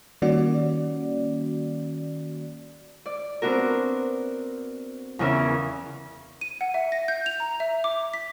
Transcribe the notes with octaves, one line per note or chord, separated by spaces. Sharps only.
D#3 G3 A#3 C#4 F#4 D5
D5
B3 C4 D4 F#4 A#4
E2 C#3 B3 C#4 A#4 E5
D#7
F#5
E5
A#6
G6
F7
A#5
E5
D6
B6